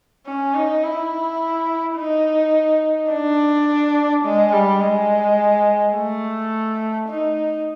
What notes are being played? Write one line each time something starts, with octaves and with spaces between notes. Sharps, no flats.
C#4
D#4
E4
D#4
D4
G#3
G3
G#3
A3
D#4